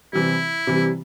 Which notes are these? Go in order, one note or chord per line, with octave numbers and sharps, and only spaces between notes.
C3 E3 G3 E4
C3 E3 G3